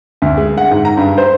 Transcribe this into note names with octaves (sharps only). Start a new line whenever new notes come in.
D2
G#3
F#5
G#2
A#5
G2
C5